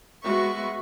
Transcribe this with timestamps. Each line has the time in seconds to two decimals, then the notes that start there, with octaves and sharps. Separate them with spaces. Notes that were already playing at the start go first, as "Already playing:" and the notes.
0.23 G#3 B3 F#4 E5 C#6